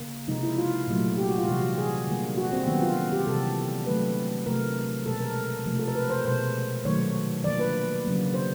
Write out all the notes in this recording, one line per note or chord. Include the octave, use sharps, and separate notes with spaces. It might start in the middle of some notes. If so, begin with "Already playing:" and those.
Already playing: C#3 A#3
C3 F3 G#3 D#4
E4
F4
A#2 F#3 A3
G4
F#4
F4
C3 E3 G3 F#4
G#4
D3 G3 A#3
F#4
C4
D#3 F#3 A#3 B3
F4
G4
C3 E3 G3 A4
D3 F#3 A3 B4
C3 F3 A3 A#4
B2 G#3 A4
A#4
C3 F3 A3
A4
A#4
B4
C5
B2 G#3 C5
D#3 F#3 A3 C#5
D3 F3 A#3 D5
B4
C#3 F#3 A#3
C5